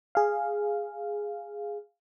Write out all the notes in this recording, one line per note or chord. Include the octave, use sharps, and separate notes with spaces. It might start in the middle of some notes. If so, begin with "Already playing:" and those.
G#4 F5